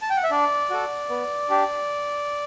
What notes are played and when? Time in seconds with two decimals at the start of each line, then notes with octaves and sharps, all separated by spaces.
0.02 A5
0.10 G5
0.17 F#5
0.23 E5
0.31 D4 D5
0.70 F#4 A4
1.10 B3
1.49 D4 G4